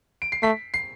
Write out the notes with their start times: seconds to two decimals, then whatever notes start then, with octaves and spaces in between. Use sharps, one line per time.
0.22 D7
0.32 C7
0.42 A3 B6
0.74 C7